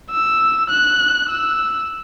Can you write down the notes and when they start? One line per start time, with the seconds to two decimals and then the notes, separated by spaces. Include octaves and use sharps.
0.11 E6
0.70 F#6
1.29 E6